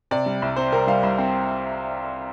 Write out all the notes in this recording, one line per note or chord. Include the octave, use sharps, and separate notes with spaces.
C3 D5
G3
C2
C4 C5
C3 A#4
G3 F5
C2
C4